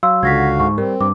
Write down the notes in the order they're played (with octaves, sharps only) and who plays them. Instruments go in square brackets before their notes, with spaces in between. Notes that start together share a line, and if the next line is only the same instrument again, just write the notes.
[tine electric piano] F#3 [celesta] F5 C6 E6
[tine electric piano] C#2 [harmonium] D3 F#4 F5 [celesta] G#6 A#6 B6
[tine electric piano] G#2 [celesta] C#6
[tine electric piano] G3 [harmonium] C4 [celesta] A#4
[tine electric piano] G2 [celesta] D6